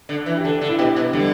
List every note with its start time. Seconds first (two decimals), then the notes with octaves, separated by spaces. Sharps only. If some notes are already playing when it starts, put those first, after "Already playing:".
0.09 D3
0.26 E3
0.37 G4
0.44 D3 A4
0.61 D3
0.69 E4
0.78 B2 G4
0.96 B2
1.13 D3 G3